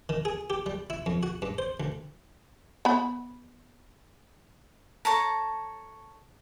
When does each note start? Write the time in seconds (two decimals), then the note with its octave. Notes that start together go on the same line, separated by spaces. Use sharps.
0.09 D#3
0.25 G#4
0.50 G4
0.66 G3
0.90 E4
1.06 F2
1.23 F#4
1.42 G2
1.58 C5
1.80 D2
2.85 B3 B5
5.05 A4 C#5 A5 A#5